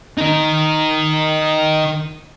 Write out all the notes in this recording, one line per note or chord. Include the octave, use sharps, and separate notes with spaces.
D#4 A#4